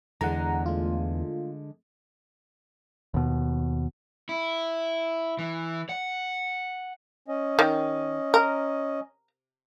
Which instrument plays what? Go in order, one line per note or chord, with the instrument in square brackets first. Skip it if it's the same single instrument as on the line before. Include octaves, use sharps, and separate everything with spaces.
[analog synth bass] E2 [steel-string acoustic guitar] D3 G#3 [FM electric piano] F#5 A#5
[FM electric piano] A3 F4
[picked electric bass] D#2 B2
[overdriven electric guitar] E4
E3
F#5
[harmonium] C#4 D#5
[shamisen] D#3
A#4